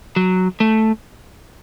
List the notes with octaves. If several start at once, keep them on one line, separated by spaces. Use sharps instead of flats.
F#3
A3